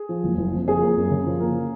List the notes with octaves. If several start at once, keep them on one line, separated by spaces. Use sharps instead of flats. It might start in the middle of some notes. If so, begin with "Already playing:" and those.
Already playing: G#4
F3
F#1
F#1
F2
F3 G#4
A#3
F#2
C#3
F3
A#3